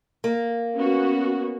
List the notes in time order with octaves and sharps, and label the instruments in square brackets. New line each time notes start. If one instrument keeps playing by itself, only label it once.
[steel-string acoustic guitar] A#3
[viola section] B3 C#4 F#4